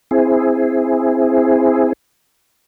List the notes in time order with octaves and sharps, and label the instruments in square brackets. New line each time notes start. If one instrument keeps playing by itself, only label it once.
[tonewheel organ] C4 E4 G#4